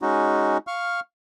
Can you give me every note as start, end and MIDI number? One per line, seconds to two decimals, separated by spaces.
0.02 0.58 56
0.02 0.58 61
0.02 0.58 63
0.02 0.58 66
0.67 1.00 77
0.67 1.00 85
0.67 1.00 89